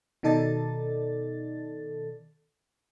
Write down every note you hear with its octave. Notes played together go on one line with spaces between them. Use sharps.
B2 D#3 D#4 A4 D5 A6